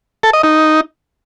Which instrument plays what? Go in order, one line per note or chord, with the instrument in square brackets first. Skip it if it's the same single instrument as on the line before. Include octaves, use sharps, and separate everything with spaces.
[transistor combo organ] A4
D#5
D#4